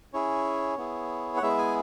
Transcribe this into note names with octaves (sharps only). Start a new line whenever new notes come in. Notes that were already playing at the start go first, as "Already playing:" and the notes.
C#4 E4 G#4 C#5
B3 E4 G#4
F#5
G#3 B3 E4 G#4 E5
G#5